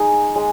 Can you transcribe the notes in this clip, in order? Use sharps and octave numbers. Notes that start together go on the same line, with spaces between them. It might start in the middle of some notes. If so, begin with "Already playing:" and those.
Already playing: G#3 D#4 G#4
G#3